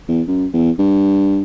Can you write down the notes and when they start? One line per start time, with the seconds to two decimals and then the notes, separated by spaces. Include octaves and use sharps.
0.08 E2
0.28 F#2
0.53 E2
0.79 G2